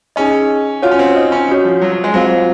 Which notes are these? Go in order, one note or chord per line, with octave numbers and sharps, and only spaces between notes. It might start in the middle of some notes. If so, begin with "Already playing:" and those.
C#4 D#4 G#4 D#5
F4 F#4 C#5 F#5
C#4
C4
D#4
C#4
C#4 F#4 C#5
F3
F#3
F#3
G#3
F#3 C4 F4 C5 F5